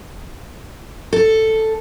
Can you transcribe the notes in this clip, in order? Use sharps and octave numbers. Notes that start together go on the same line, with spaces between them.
A4